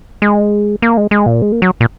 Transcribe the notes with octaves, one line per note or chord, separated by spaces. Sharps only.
G#3
A#3
G#3
G#3
A#2
G#3
A#3
F#3
A#2